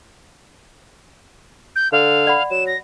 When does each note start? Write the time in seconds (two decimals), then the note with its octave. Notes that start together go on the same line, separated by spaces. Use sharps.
1.76 G6
1.92 D3 F5
2.27 D5 F#5 B5
2.51 F#3 E7
2.67 A#6